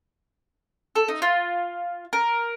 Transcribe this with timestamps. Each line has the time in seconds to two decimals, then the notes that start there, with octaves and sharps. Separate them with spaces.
0.96 A4
1.08 D#4
1.22 F4
2.13 A#4